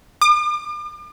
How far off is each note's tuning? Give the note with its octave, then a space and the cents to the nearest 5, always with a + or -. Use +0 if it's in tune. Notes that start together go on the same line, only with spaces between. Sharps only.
D6 +45